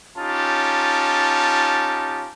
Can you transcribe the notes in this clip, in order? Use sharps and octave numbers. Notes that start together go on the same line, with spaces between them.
C#4 D#4 F4 G4 A5